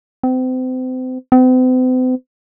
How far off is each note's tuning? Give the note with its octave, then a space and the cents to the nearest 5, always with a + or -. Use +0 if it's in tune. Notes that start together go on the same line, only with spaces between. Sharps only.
C4 -35
C4 -45